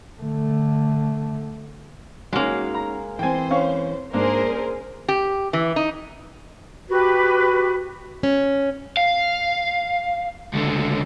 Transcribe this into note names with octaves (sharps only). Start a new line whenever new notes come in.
D3 A3
F#3 G#3 A#3 C#4 D#4 F#4
A#5
E3 C4 C5 G5 G#5
C#4 F5 C#6
G#2 A#3 D4 G#4 A#4 C5
C#4
G4
E3
D#4
F#4 G4 B4
C#4
F5
C#2 D3